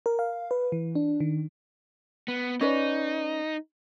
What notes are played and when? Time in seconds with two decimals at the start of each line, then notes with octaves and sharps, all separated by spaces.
0.06 A#4
0.19 F5
0.51 B4
0.72 E3
0.95 D4
1.20 D#3
2.28 B3
2.61 C#4 D#4 B4 D5